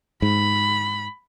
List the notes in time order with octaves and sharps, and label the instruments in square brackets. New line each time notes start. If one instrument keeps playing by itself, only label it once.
[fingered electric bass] G#2 [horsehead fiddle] B5